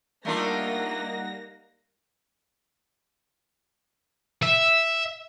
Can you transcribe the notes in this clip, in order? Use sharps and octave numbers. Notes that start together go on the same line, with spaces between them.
G3 A3 A#3 D4 D#4 F4 F#5 A#6
E5